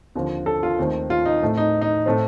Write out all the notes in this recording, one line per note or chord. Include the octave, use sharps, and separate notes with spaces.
D#2 D3 F3 C4
A4
F4
D#2 D#3 A3 C4
F4
D#4
A2 A3 C4
D#4
D#4
A2 A3 C4